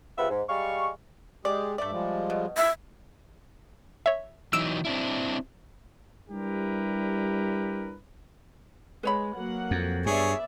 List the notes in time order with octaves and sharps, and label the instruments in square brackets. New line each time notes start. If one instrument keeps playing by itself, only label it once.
[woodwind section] C#2 C3 F4 B4 E5
G#2
G3 G#3 F5 C#6
[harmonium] G#3 G4 G#4 [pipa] D5
[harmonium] G2 E5 [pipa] A3 D5
[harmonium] F3 G3 G#3
[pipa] B2
[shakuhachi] E5
[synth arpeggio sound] C#5 E5
[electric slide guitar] E3 F#3 D#4 [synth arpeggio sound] E6 D7 E7
[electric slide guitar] C4 D4 E4
[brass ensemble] G3 D4 E4 G4 A#4 B4
[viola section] G#3 [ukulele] B4 C#5 B5
[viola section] F#3 A#3 F#5
[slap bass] F2
[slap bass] G2 [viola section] B3 D5 E5 [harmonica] G#4 C#5